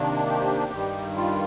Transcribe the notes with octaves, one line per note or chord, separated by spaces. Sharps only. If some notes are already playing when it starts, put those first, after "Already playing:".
Already playing: C3 D#3 A#3 D4
G4
G2 D#3 G3
F4